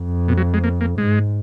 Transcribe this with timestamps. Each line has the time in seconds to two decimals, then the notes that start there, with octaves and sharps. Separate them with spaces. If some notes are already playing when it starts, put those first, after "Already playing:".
Already playing: F2
0.28 B2
0.37 F#3
0.54 G#3
0.64 A#3
0.81 A#3
0.98 G#2 G#3